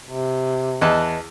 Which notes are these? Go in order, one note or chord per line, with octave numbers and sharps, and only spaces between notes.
C3
E2 B4 D#5 A5